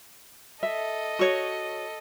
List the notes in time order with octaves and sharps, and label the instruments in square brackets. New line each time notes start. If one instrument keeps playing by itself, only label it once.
[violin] A4 D#5 [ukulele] E5
[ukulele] F#4 C#5